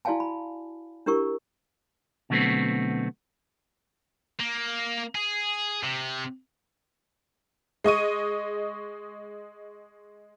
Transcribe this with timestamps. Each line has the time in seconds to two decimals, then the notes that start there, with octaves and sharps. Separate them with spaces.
0.05 E4 F#4 D5 F5 G#5 A5
0.20 B5
1.06 D4 E4 G4 A#4 C#6
2.30 B2 D3 F#3 A3 B3 C4
4.40 A#3
5.15 G#4
5.83 C3
7.84 G#3 D#5 C#6 D#7